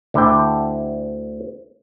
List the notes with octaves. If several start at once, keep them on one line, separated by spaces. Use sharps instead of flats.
D2 D3 E4 A4 G5